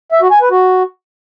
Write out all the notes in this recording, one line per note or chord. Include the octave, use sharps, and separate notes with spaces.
E5
F#4
G#5
B4
F#4